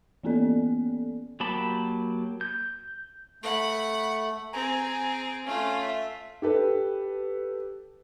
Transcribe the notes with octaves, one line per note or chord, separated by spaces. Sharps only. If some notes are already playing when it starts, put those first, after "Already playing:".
E3 A#3 B3 C#4 A4 D5
F#3 A#3 G4 A5 B5
G6
A3 F#5 B5
C4 G#4 G#5 A#5
A3 C#4 F4
E5
G4 A4 B4